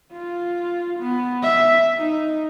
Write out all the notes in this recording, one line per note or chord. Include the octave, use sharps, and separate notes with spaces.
F4
B3
E5
D#4